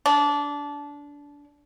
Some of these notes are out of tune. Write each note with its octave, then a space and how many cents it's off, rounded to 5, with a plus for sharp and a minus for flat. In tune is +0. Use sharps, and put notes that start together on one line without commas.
D4 -20